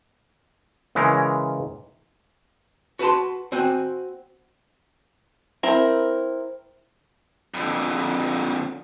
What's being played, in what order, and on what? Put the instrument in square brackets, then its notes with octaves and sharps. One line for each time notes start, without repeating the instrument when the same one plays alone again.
[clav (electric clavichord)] C#3 E3 G#3 C#4 A#4
[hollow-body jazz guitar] F#4 B4 F#5 A5 C6
C4 F#4 G5 G#5
[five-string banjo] C4 E4 A#4
[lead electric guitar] F2 D3